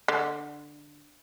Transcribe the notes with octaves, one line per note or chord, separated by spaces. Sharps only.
D3